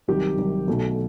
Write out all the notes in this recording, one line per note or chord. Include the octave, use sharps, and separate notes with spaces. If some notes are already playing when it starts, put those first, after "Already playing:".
C2 C3 D#3 F#3 G4
C2 C3 D#3 F#3
B1 B2 F#3 A3